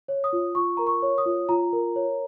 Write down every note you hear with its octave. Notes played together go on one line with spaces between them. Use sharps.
C#5
D#6
F4
F4 C#6
A#4 A#5
C#6
C#5
D#6
F4
F4 A#5
A#4
C#5